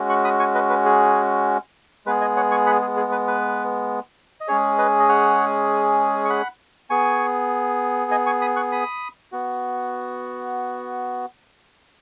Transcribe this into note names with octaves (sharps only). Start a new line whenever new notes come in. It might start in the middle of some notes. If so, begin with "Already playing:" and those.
Already playing: G#3 C#4 F#4
C#6 F#6
B5 D#6
G#5 C#6
B4 D#5
B4
G#4
G#3 B3 G#4 B4
D#5 G#5
C#5 F#5
G#5 C#6
F#5 B5
G#4
G#4
B4
B4
D#5
G#3 C#4 G#4 C#5
B4 D#5
D#5
C#5 F#5
C#6
F#5 B5
B3 G#4 G#5 C#6
D#5 G#5
G#5 C#6
B5 D#6
C#6 F#6
B5 D#6
B3 F#4